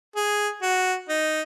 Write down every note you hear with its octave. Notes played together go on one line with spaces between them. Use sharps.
G#4
F#4
D#4